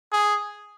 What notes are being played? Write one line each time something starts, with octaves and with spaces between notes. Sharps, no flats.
G#4